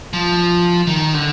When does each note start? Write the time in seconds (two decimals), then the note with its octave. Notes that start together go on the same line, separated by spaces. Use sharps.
0.13 F3
0.87 D#3
1.14 D3